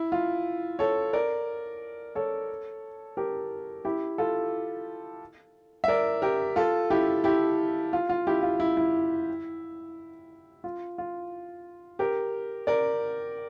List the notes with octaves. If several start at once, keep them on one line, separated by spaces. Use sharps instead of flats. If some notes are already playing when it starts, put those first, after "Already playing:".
Already playing: E4
F4
A4 C#5
A#4 D5
A4 C#5
G4 A#4
E4 G4
F4 A4
E5
A#4 D5
G4 A#4
F4 A4
E4 G4
E4 G4
F4
F4
E4 G4
F4
E4
E4
F4
F4
G4 A#4
A#4 D5